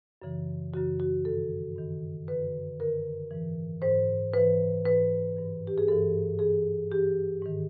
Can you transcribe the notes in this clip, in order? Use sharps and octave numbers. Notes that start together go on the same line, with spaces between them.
F#2 C#3 E3
F#2 C#3 E3 F#4
F#4
G2 D#3 A4
G2 D#3
F#2 D3 B4
F#2 D3 A#4
G#2 E3
G#2 E3 C5
G#2 E3 B4
G#2 E3 B4
G2 E3
G4
G#4
G2 E3 A4
G2 E3 G#4
G2 E3 G4
G#2 D#3